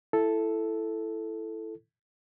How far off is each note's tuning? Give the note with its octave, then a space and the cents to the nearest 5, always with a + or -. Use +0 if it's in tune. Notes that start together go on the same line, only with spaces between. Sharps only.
E4 +10 A4 +0